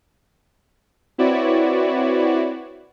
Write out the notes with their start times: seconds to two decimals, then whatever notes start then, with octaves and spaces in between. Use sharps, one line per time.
1.18 C4 E4 F#4 B4 C#5 D5